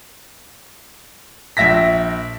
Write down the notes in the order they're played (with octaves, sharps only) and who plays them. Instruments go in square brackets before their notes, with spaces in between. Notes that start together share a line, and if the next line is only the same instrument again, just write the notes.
[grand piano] A#1 E5 A#6 B6